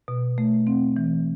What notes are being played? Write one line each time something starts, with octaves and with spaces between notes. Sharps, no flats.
B2
A3
C4
E3